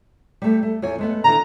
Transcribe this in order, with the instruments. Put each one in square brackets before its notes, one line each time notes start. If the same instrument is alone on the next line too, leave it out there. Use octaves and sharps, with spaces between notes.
[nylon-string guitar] G3 A3
A3
E2 C#5 G#5
G#3 A3 B3
[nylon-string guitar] D3 E3 [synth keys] A#5